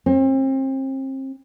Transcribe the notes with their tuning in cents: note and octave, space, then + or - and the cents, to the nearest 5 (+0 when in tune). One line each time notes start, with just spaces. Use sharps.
C4 +35